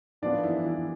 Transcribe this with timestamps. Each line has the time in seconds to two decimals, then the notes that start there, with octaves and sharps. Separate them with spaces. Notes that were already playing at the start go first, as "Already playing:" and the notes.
0.22 A2 F3 B3 D4 D5
0.44 E3 E4
0.65 E3 E4